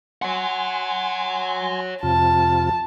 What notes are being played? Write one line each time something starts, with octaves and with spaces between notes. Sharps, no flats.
C#5 F#5 G#5 C6
F2 C3 F4 A5